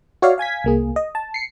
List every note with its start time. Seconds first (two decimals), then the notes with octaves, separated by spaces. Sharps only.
0.22 F#4 C#5 D5 E5 F5
0.38 F5 G#5 G#6 B6
0.64 C2 A#3 G#4
0.96 D#5
1.15 A5
1.34 C7 C#7